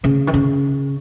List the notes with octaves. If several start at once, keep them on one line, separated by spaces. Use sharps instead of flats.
C#3
D#3
C#3